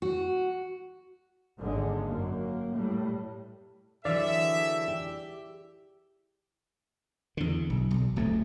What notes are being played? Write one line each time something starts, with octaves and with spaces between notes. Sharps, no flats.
F#4
G#1 D#2 D3 G#3
F#2 A#3
A2 G3
D3 E3 F#3 G#4 D5 E5
G4
E2 D3
B1
B1
D1 F2 A3